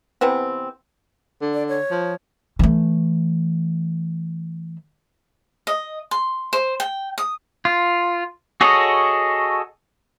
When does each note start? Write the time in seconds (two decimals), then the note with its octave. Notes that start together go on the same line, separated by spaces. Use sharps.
0.21 C3 E3 B3 C4
1.41 D3
1.54 D5
1.68 C#5
1.91 F3
2.59 E3 A3
5.67 D#5
6.11 C6
6.53 C5
6.80 G5
7.18 D#6
7.65 F4
8.61 F#4 G#4 A4 C#5 D#5